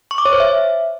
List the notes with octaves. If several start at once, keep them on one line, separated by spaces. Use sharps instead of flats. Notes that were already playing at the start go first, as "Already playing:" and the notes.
C#6
D6
C#5
C5
E5